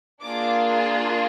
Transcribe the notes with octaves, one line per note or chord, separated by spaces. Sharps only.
A#3 D4 F4 G#4 D6